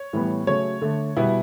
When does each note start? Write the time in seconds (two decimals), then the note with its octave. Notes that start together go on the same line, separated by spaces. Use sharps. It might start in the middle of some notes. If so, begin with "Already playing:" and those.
Already playing: C#5
0.13 A2 E3 G3 B3
0.47 C#3 F#3 A3 C#5
0.81 D3 A3
1.17 B2 G3 B3 E4